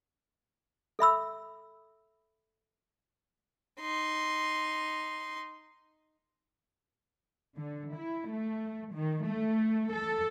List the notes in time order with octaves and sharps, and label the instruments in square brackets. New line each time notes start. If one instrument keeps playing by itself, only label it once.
[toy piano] A4 E5 B5 E6
[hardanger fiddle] D#4 C6
[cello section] D3
E4
A3
D#3
A3
A4